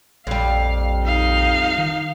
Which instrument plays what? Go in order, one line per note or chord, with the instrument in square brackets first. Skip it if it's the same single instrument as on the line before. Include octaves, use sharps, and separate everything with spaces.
[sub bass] A#1 [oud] F2 G3 [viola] F5
[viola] D#4 F5
[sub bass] D#3